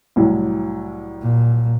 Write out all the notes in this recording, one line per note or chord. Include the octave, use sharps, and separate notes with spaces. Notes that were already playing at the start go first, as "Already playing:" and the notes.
C2 A2 F#3
A#2